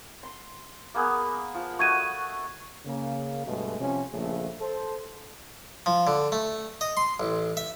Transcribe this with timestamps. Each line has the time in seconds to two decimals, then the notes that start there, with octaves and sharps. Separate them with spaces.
0.23 C6
0.94 A#3 B3 G#4
1.55 F3
1.79 A3 F#4 D#5 C#6 G#6 D#7
2.86 C#3 A#3
3.45 G2 B2 G#3 A3
3.79 C3 F3 C#4
4.13 A#1 C#3 A3
4.61 A4 C5
5.86 F3
6.07 D3
6.32 A3
6.81 D#5
6.97 C6
7.20 A1
7.57 E5